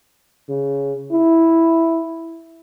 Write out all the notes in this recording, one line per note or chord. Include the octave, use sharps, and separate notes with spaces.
C#3
E4